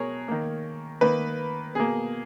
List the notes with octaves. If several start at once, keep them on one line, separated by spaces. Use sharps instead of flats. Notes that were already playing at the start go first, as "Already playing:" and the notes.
Already playing: B2 G#4 A#4 C#5
D#3 A#3
D#3 A#3 B4
B2 A#3 G#4